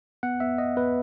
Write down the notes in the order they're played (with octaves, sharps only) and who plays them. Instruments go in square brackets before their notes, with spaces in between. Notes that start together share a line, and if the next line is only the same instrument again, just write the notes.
[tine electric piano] B3 F#5
B3 E5
B3 D#5
B3 B4